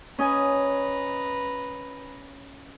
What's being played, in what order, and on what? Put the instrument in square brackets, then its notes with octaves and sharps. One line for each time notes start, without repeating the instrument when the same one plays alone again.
[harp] C#4 D#5 G#5 [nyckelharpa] B4 A#5